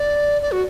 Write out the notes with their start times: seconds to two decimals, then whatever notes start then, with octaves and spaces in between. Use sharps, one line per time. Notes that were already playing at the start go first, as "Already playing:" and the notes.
Already playing: D5
0.42 D5
0.52 F#4